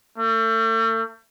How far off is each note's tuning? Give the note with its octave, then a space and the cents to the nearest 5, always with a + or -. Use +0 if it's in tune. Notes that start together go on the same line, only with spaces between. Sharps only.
A3 +40